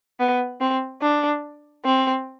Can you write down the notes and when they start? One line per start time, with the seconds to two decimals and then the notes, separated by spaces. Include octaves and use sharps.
0.20 B3
0.60 C4
1.02 D4
1.85 C4